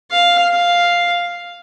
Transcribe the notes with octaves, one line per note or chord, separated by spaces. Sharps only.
F5
F5